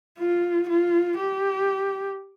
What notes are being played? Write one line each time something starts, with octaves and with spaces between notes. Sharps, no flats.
F4
F4
G4